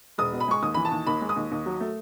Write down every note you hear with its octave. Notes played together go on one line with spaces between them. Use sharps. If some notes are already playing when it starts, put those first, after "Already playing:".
E1 D#6
B2
B5
G#3 C#6
D#2 D#6
E3 B5
A5
D#2
D#2 B5
G#3
D#6
D#2
D#2
F#3
A3